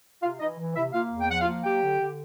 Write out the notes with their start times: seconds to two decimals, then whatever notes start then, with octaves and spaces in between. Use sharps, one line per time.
0.22 C3 F4 F5
0.40 E3 D#4 D#5
0.58 E3
0.76 C3 E4 E5
0.93 A#3 F4 F5
1.12 E2
1.21 G5
1.29 F3 F#5
1.41 F4 F5
1.47 A#3
1.64 F#3 G4 G5
1.82 D3
2.00 D3